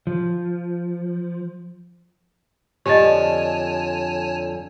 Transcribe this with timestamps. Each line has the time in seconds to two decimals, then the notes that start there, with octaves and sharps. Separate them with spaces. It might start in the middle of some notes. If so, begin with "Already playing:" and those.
0.07 F3
2.86 F2 D3 F3 G4 C#5 D#5 G#5 A5